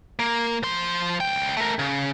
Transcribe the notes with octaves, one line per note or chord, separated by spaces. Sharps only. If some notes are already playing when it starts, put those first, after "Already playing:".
A#3
F3 C6
C#2 G5
A3 A#4
C#3